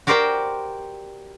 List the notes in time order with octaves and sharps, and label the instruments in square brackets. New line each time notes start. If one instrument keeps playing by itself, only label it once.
[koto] F#4 G4 A#4 C5 D5 G5